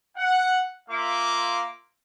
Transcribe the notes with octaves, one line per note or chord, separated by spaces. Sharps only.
F#5
A#3 F4 E5 C6 D6